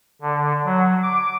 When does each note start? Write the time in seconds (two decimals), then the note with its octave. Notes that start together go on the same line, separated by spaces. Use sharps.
0.21 D3
0.65 F#3
1.03 D6